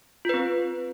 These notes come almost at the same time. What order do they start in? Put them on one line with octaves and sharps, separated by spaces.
F4 B4 C4